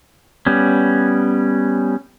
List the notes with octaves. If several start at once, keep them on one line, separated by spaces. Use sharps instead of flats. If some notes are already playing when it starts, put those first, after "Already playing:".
G3 B3 C#4